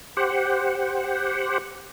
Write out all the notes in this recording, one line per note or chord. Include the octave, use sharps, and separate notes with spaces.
G4 C5 F#5